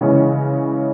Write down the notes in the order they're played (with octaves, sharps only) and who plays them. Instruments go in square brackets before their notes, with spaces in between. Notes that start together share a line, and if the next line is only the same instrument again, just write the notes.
[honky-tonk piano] C#3 E3 G#3 C#4 E4